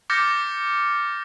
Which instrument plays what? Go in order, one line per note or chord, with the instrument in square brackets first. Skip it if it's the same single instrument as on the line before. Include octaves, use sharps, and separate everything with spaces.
[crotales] D6 F6 G6 A6 A#6 C#7